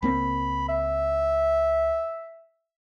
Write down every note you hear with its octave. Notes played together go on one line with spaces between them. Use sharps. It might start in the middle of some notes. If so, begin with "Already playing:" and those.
C#2 A#3 C4 B5
E5